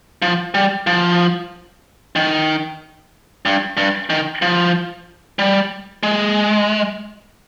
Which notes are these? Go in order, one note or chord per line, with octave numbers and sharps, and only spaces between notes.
F3
G3
F3
D#3
G2
G2
D#3
F3
G3
G#3